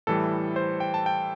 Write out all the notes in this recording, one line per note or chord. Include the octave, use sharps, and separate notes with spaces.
A2 E3 G3 A4
C5
G5
A5
G5